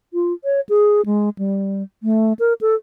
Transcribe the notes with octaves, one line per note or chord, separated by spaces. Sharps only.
F4
C#5
G#4
G#3
G3
A3
A#4
A4